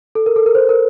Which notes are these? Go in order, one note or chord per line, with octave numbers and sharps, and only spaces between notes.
A4
A#4
A4
A#4
C5
A#4